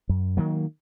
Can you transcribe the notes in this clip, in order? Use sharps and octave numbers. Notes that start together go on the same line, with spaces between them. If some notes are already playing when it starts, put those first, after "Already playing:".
F#2
D#3 F#3 A#3